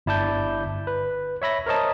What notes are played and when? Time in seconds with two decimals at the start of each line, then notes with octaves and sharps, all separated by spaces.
0.06 G1 E4 D5 A5 G6
0.87 B4
1.42 C#5 E5 B5 A#6
1.66 A#4 C5 C#5 D#5 A5